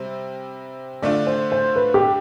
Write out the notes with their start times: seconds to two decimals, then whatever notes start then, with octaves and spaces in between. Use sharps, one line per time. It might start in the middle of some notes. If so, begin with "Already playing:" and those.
Already playing: C3 G3 C4 C5
1.02 D3 A3 D4 F4 D5
1.27 C5
1.52 C5
1.76 B4
1.94 G4